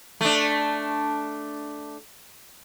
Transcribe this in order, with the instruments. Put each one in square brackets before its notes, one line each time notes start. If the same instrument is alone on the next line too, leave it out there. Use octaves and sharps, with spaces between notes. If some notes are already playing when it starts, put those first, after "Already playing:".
[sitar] A3 D4